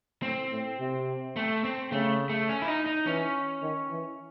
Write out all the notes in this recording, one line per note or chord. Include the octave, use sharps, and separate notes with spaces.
A2 C4
A2
C3
A3
C4
C#3 A3
A3
C#4
E4
D#4
D#4
E3 C#4
D#3
E3